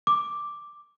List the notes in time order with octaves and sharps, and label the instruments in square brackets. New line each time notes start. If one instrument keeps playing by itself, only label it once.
[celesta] D6